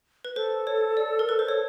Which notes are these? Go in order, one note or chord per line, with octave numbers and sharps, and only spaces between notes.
B4
A4 C5
C#5
D5
A#4
B4
C5
C#5